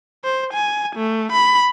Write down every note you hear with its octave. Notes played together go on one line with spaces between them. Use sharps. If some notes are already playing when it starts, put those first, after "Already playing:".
C5
G#5
A3
B5